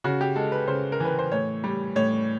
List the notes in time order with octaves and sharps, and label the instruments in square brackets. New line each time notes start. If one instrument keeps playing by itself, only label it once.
[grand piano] C#3 F#4
G4
G#3 A4
B4
C#3 C5
A#4
E3 B4
C5
A2 C#5
G3
A2 C#5